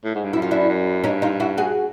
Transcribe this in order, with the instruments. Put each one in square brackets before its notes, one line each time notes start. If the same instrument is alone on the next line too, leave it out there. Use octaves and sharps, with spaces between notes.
[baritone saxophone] A2
G#2
G2
[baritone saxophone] F#2 [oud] E4
[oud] F4
D4 E4
[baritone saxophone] F#2
[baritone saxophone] G2 [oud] C#4 D#4
[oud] D#4 F4
E4 F#4
F#4 G#4